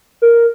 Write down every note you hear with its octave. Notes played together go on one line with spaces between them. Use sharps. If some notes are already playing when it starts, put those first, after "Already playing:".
A#4